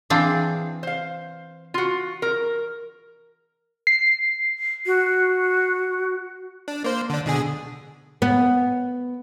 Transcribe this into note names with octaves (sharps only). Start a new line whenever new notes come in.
E3 C4 D4 G#4 F5
C5 F5
F4 F#4
A#4
C7
F#4
D4
A#3 C5
D3 D4
B2 D3 G#4
B3